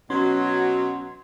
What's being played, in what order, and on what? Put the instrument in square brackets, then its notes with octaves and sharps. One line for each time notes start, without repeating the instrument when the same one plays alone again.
[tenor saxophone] B2 [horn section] F#3 [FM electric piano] C#4 G#6 [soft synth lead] C6